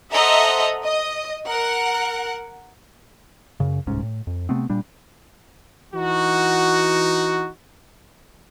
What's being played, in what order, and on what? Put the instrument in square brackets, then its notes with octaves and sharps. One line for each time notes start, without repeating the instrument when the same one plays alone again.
[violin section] A4 C5 D#5 E5 F#5 A#5
D#5
A#4 F#5
[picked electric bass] F#2 C#3
D1 C2 G#2 C#4
A2
F2
C3 A3 B3 C4
A#2 G3 D4
[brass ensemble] E3 D#4 F#4